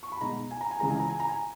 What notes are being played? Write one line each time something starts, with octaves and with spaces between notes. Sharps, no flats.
C#6
B5
B2 G#3 D#4 A#5
G#5
A#5
G#5
C#2 C#3 E3 G#3 A#5
G#5
A#5
G#5
A#5
G#5